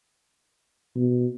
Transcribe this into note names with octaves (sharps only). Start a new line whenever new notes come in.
B2